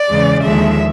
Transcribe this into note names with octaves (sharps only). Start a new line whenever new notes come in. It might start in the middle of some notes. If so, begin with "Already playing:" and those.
Already playing: D5
E2 C#3 E3 G#3
D#2 D3 F3 G#3 E5